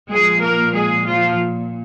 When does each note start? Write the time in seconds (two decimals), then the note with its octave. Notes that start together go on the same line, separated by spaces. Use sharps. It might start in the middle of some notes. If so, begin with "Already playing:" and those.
0.11 A#2 F3 G#3 G#4
0.42 A#3 A#4
0.74 G#3 G#4
1.06 F3 F4